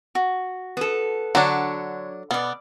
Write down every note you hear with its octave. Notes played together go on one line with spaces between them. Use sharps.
F#4
B3 A4
D3 F#3 D4 C#5 F#5
B2 B3 D5